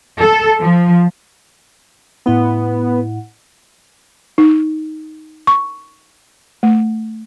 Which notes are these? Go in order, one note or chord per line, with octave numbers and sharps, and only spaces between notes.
A4
F3
A2 B3 E4 F#5
D#4
C#6
A3